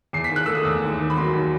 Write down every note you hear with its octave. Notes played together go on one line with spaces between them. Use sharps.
E2 C7
B6
D#3
F#6
A3 E6
D#6
E2 E6
D#2
D#3
B5
F#3 C6
D#2